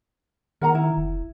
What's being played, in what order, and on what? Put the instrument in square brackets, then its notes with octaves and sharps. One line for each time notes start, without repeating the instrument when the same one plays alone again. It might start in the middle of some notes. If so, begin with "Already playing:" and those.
[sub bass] D#3 [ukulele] A#4 F#5 A#5
[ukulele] E4
[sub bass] F1